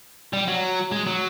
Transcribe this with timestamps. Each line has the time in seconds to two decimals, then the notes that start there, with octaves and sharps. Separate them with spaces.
0.33 G3
0.48 F#3
0.92 G#3
1.06 F#3